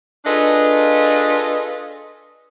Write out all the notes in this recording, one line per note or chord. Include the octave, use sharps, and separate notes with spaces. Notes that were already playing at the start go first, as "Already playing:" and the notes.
D4 F4 G#4 A4 B4 D#5